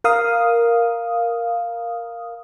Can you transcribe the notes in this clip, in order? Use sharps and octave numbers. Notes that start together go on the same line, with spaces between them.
A#4 F5 D#6